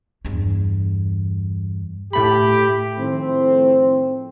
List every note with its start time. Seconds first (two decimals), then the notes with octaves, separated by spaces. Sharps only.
0.25 E2 G2
2.13 A2 A3 G4 B5
2.99 A2 D#3 F3 A3 C4